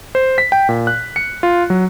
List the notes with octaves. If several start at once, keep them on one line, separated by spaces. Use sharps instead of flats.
C5
B6
G5
A#2
F#6
C#7
F4
F#3